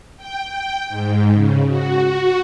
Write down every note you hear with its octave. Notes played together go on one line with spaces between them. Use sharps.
G5
G5
G#2
C#3
F#4
F#4